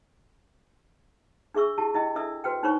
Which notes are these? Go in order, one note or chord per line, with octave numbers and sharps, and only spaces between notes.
D4 G#4 E5 C#6 E6
E4 G4 A5
E4 D#5 G5
D4 A4 D5 E5 D#6 E6
F#4 B4 C5 G5
D4 D#4 C5 C#5 A#5 C#6